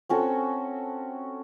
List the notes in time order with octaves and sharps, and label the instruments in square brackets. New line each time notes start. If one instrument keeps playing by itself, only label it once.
[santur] C4 C#4 F#4 A4